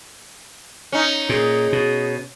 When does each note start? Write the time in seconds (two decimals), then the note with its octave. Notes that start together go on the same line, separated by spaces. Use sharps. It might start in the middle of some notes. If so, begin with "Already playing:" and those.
0.92 C#4 D#4
1.29 A#2 G#4
1.73 B2